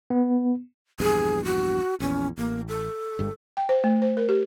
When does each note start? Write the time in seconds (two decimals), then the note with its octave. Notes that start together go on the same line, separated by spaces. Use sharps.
0.10 B3
1.00 A#1 E2 G2 G#4
1.45 F#4
2.00 A#1 E2 C#4
2.38 A1 A#3
2.68 A4
3.19 G1 G2 G#3
3.57 G5
3.69 C5
3.84 A3
4.02 C5
4.17 A#4
4.29 G4